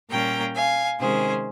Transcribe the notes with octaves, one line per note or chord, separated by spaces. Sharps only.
A#2 G3 A#3 C#4 G5 A#5
F5 G#5
C3 D#3 G#3 C#4 G#4 C5